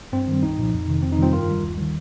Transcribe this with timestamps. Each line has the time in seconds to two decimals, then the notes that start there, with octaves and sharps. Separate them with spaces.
0.13 G2 C4
0.28 D#3 G3
0.43 C2 D#4
0.58 A#2 F3
0.73 F2
0.88 C3 D#3
1.03 F2 C4
1.12 D#4
1.18 C3 D#3 G3 C4 F4
1.33 G2 F4 A#4
1.48 D#3 G3
1.62 D#2
1.78 D#3 G3